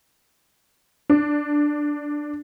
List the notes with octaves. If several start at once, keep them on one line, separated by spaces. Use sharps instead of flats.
D4